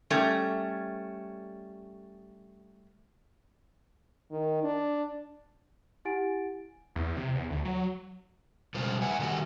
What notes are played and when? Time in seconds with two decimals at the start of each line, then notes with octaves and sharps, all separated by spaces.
0.10 G3 A3 C#4
4.31 D#3
4.63 D4
6.05 E4 G4 F#5 G#5 A6 D7
6.96 E2
7.17 C3
7.35 E2
7.50 D2
7.65 F#3
8.74 B2 G3 G#3 F4 C5
9.02 B4 E5 F#5 G#5
9.20 D#3 G3 A3 D#4 F#4